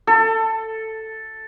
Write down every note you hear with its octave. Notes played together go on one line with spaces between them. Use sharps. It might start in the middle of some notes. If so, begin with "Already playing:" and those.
A4